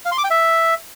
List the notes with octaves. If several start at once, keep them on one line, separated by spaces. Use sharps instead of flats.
F5
C6
D6
G5
E5